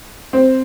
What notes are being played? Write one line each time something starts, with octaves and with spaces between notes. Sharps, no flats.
C4